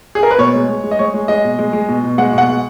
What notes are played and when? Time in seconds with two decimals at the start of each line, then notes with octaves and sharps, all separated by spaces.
0.15 G#4
0.23 A#4
0.31 B4
0.38 B2 C#5
0.54 G#3
0.69 G#3
0.84 G#3
0.91 D#5
0.99 G#3 C#5
1.14 G#3
1.28 G#3 D#5
1.44 B2
1.59 G#3
1.73 G#3
1.89 B2
2.04 B2
2.18 G#3 F#5
2.33 B2 F#5
2.48 G#3